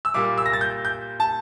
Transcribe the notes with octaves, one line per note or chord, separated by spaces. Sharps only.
E6
A#2 G3 A#3 D6
E6
A#6
A6
G6
G6
A5